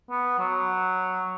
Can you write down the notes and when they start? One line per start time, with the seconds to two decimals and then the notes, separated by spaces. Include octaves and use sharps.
0.10 B3
0.39 F#3